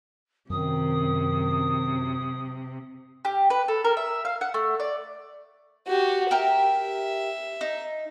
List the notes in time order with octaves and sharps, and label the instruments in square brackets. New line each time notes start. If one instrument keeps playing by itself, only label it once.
[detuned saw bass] F#2 [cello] C3 [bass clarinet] D#3 [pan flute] D#6
[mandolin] G4
B4
A4
A#4
E5
F5
F#5
A3
D5
[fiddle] F#4 G4
[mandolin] G4 A#4 [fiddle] E5
[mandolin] D#4